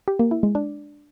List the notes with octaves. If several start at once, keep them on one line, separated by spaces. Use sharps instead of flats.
G4
A#3
E4
G#3
D4